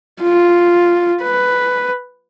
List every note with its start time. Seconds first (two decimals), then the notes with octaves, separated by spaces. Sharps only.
0.22 F4
1.23 B4